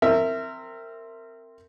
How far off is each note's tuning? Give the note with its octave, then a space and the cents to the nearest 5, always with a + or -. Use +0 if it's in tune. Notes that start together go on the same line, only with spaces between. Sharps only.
C4 +0 A#4 -25 E5 +0